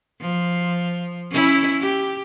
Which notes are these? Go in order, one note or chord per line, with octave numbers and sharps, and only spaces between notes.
F3
C#4 E4
G4